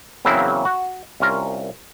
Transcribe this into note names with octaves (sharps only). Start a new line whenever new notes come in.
E2 C#3 F#3 A#3 C4 E4
F#4
C2 C#4 F4 A#4